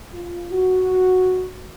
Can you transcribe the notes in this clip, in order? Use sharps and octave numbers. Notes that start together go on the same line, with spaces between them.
F4
F#4